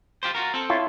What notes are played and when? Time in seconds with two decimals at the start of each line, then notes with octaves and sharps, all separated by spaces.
0.23 F4 G4 C5
0.35 F4 F#4 A#4
0.54 C4 A4
0.70 E4 F4 C#5